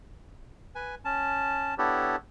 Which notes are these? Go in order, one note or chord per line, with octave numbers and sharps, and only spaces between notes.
B4 G#5
C#4 A5
B3 D4 E4 G4 A4 C#5